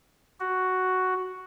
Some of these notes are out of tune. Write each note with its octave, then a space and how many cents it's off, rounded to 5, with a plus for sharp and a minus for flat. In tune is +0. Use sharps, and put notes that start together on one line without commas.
F#4 +5